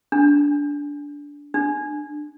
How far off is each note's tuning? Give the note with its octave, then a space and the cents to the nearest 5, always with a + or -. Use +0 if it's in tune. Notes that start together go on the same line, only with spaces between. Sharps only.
D4 -15
D4 +10